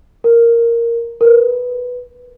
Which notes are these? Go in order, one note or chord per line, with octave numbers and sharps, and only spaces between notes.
A#4
A#4
B4